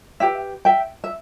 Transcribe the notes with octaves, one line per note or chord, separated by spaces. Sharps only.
E4 G4 B4 E5 G5
E5 G5
E5